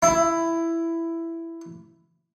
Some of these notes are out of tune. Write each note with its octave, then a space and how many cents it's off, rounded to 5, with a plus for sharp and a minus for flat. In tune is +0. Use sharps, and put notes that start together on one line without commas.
E4 +10